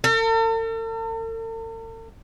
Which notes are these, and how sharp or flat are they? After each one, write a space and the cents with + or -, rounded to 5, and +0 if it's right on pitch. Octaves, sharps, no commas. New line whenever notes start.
A4 +45